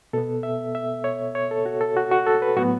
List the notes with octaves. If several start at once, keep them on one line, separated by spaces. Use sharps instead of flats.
B2 B3 A4
E5
E5
C#5
C#5
A4
F#4
A4
F#4
F#4
A4
B4
A2 F#3 B3 F#4